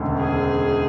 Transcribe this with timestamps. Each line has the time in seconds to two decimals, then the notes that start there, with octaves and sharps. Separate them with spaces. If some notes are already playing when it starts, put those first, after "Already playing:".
Already playing: E1 D2 C#3
0.20 G#4